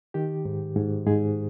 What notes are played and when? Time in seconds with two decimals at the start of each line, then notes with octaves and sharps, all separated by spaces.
0.14 D#3 G4
0.45 G#2
0.76 G#2
1.06 G#2 G#4